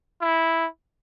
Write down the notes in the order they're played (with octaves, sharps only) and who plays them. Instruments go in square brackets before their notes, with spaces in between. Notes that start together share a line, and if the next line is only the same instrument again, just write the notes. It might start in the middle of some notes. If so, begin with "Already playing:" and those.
[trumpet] E4